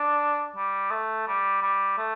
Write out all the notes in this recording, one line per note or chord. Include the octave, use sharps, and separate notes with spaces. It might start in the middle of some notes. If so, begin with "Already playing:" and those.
Already playing: D4
G3
A3
G3
G3
A3